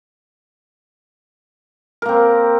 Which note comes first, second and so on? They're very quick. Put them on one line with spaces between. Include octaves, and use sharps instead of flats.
A#4 A#3 C4